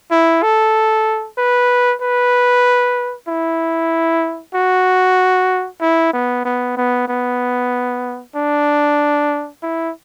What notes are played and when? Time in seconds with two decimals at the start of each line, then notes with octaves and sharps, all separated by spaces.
0.11 E4
0.43 A4
1.38 B4
2.01 B4
3.28 E4
4.55 F#4
5.81 E4
6.13 B3
6.45 B3
6.78 B3
7.08 B3
8.36 D4
9.63 E4